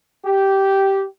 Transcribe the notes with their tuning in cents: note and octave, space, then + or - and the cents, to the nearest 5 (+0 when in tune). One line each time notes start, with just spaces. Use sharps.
G4 -10